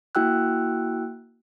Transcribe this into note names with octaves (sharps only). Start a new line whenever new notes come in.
A#3 E4 F#4 G5 E6 F#6